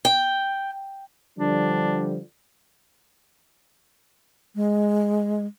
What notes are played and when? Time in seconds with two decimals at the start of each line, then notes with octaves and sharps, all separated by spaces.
0.05 G5
1.38 D3 F3 G3 D4
4.55 G#3